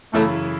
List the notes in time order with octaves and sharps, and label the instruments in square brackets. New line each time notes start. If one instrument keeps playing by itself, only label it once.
[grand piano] F#2 C#3 E3 C#4 E4 [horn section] A3